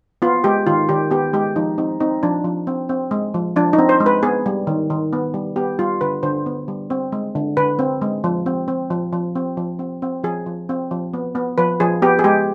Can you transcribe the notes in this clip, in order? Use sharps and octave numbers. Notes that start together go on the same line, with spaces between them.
B3 F4
G#3 G4
D#3 F4
D#3 G4
B3 G4
G#3 G4
F3 D#4
C4 D#4
C4 D#4
F3 D4
F3
C4
C4
G#3
F3
F3 D4
D#4
C4
C5
G#3
B4
B3 G#4
G3
D#3
D#3
B3
G3
B3 G4
G3 F4
D3 B4
D3 C5
B3
G3
C4
G#3
D3
D3 B4
C4
G#3
F3
C4
C4
F3
F3
C4
F3
C4
C4
F3 G#4
F3
C4
F3
B3
B3
F3 B4
F3 G#4
B3 G4
G#4
G#3 G4